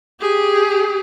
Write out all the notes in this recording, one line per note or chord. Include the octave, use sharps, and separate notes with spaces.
G4 G#4